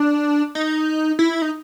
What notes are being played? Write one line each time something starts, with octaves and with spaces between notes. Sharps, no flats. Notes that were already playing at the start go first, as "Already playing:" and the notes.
Already playing: D4
D#4
E4
D#4